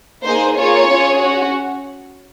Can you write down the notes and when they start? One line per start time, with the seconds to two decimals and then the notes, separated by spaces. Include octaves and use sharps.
0.24 A#3 D#4 G#4 C5
0.57 A#3 F4 G#4 C#5
0.89 C#4 F4 G#4
1.21 C#4 F#4